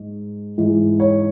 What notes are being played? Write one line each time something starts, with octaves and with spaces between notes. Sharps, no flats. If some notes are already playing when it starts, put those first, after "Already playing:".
Already playing: G#2
G#2 E3
C#5